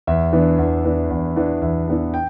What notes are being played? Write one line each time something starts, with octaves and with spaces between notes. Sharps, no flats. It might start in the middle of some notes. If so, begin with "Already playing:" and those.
E2 E5
E3 B3 D4
E2
E3 B3 D4
E2
E3 B3 D4
E2 E5
E3 B3 D4
G5